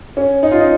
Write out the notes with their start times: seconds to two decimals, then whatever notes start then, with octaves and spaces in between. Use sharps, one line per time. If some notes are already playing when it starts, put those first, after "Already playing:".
0.17 C#4
0.43 D#4
0.51 F4
0.60 D#4